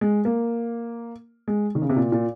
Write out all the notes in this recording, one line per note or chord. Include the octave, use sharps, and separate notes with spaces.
G#3
A#3
G#3
D#3
C#3
C3
A#2
A#2